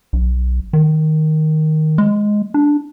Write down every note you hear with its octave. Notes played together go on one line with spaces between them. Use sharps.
B1
D#3
G#3
D4